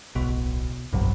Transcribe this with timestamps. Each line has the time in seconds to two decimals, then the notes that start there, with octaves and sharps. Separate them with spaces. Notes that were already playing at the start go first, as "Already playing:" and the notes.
0.15 D1 B1 B2
0.93 F1 B1 G2 F#3